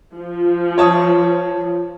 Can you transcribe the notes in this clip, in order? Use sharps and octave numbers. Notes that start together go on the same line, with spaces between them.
F3
C#5 A5 D#6